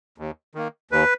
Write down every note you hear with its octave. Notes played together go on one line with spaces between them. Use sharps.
D#2
D#3 A#3
D#2 B4